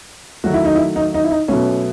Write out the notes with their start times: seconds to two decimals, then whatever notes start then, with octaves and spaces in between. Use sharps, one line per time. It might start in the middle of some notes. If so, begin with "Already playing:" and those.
0.44 D#3 F#3 A3 F#4
0.54 E4
0.65 D#4
0.75 E4
0.96 D#4
1.14 D#4
1.24 E4
1.31 D#4
1.48 B2 F#3 A3 C#4